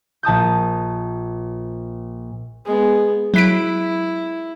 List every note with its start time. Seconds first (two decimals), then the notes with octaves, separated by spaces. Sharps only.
0.23 A#1 A5 D#6 G6
2.65 G#3 B3
3.34 F#3 E4 B6 D7